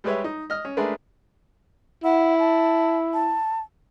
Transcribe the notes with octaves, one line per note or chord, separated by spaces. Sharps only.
G3 G#3 G4 B4 C#5 E5
D#4
D#5 F6
C#4
G#3 A3 D4 G#4 A#4 B4
E4 F#5
A5
A5